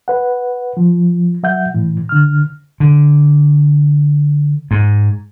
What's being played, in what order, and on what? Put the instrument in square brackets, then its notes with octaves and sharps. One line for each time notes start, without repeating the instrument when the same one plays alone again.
[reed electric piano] B4 F#5
F3
F#3 E5 F#5 G6
A2 E3
D3 F6
[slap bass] D3
G#2